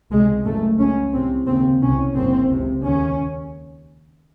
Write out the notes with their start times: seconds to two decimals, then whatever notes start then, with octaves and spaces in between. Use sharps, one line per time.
0.11 C#2 C3 G#3
0.45 F#1 F#2 C#3 A3
0.79 C#2 C#3 C#4
1.13 C2 C3 C4
1.47 D#2 C#3 C4
1.82 C2 C3 C#4
2.15 F#1 F#2 C#3 C4
2.49 C#2 C3
2.84 D#2 C#3 C#4